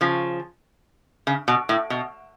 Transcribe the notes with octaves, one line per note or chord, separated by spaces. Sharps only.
C#3 F3
C#3
B2
A2
B2